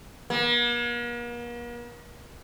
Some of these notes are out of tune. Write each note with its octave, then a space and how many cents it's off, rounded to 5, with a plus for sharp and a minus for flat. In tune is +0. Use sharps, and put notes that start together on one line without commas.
A#3 +45